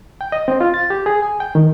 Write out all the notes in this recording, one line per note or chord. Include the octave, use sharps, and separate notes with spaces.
G5
D#5
C4
F4
A6
G4
G#4
G#5
G5
D#3